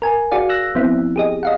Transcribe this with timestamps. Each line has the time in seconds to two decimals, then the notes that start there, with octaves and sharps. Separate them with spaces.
0.02 A#4 G#5
0.31 F#4 G#4 D5 F5
0.49 E6 F#6 A#6
0.75 F3 B3 C4 E4
1.16 G4 G#4 D#5
1.43 D#5 F5 F#5